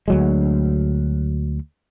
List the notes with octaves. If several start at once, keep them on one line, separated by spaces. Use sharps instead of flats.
D2 F#3 G#3